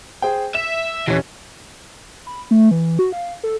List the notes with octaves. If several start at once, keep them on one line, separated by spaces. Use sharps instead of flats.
G#4 C5 G5
E5 E7
D#1 E3 C#4
B5
A3
E3
F#4
F5
A4